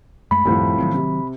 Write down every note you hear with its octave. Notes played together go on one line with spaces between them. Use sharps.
F#2 G#3 A3 B5
C2 F#2 A2 D#3 F3
D#3 F#3 C4
C3